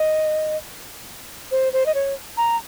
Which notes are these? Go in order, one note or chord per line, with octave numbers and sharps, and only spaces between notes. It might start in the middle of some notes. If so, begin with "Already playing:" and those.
Already playing: D#5
C5
C5
D#5
C#5
A#5